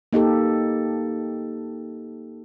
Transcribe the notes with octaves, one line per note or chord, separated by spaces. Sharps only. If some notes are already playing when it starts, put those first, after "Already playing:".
A#3 D#4 G4 A4